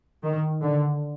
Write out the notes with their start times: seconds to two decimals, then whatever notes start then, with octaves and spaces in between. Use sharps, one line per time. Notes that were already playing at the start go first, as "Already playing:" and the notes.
0.23 D#3
0.62 D3